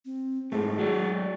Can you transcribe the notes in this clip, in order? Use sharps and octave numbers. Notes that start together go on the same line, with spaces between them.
C4
G#2 A3 G#4
F#3 F#4 D5